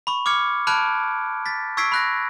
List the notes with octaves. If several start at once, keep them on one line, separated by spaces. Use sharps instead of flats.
B5 C#6
D6 F6 G#6 C#7
A5 B5 F6 F#6 G#6 D7
A6 B6
C#6 E6 G#6 B6 C7 D7
B5 F#6 A#6